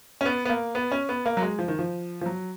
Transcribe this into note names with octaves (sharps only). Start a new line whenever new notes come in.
C#4
B3
B3
A#3
B3
C#4
B3
A#3
F#3
G#3
F3
D#3
F3
F3
F#3